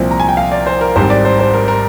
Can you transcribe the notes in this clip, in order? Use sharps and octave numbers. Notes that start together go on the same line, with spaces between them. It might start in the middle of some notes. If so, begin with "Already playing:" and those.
Already playing: C2 A#2 F3 C4
A#5
G#5
G5
F5
D5
C5
A#4
G#1 G#2 G3 C4 C5
D5
C5
C5
A#4
A#4